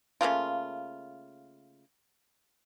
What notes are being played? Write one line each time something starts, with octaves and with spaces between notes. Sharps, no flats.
C#3 A3 A#3 F4